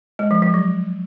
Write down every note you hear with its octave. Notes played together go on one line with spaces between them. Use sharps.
G#3
F3
F3
F#3